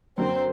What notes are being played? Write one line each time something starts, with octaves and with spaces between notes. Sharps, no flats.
F#2 D3 F#3 A#3 C4 C5